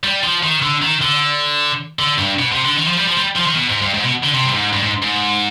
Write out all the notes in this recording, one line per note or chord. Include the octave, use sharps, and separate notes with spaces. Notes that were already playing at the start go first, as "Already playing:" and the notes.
G3
F3
D#3
D3
D#3
D3
D3
G2
B2
C3
D3
D#3
F3
G3
F3
G3
F3
D#3
B2
G#2
G2
G#2
B2
D3
C3
G2
G#2
G2
G#2
G#2